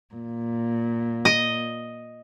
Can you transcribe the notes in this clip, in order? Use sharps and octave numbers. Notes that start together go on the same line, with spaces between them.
A#2
D#5